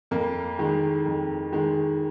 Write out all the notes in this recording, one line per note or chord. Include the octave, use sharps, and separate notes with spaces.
F2 A#3
D#3 G#3
F2
D#3 G#3